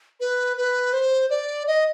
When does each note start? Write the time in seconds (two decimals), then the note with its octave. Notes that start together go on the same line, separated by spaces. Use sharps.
0.20 B4
0.57 B4
0.93 C5
1.30 D5
1.67 D#5